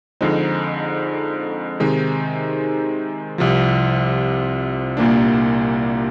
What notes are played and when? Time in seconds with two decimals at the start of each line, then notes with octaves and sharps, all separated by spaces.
0.21 F2 D3 G#3 C4 D#4
1.80 C3 D#3 G#3 C4 D#4
3.38 C2 C3 F3
4.97 C2 A#2 G3 A#3 D4